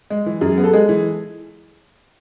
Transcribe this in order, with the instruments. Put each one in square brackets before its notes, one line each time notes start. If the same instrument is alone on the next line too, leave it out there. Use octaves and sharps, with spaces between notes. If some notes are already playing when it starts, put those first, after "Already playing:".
[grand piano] G#3
E3
[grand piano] F#2 [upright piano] G#4
[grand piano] B3
[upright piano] A4
[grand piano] G#3 [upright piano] G#4
[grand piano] E3